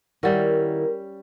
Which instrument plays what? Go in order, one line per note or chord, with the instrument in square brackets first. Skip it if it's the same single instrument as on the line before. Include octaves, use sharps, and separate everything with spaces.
[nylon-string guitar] D#3 E4 F#5 [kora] G3 C#4 [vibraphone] A#4